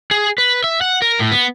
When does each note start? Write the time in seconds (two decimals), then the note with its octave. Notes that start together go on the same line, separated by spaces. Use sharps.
0.11 G#4
0.38 B4
0.64 E5
0.81 F#5
1.02 A#4
1.19 A2
1.31 B3